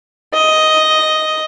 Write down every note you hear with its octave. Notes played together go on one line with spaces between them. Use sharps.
D#5